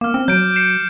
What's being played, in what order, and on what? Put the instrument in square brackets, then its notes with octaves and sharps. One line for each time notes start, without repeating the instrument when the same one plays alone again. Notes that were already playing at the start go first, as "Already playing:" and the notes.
[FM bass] A#3 [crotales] D6 F6
[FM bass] C4
[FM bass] F#3 [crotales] G6 D7
[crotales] C7 C#7 E7